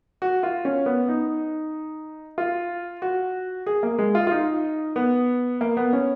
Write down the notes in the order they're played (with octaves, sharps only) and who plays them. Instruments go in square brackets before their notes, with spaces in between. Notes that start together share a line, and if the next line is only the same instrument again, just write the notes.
[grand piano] F#4
F4
C#4
B3
D#4
F4
F#4
G#4
A#3
G#3
F4
F4
D#4
B3
A#3
B3
C#4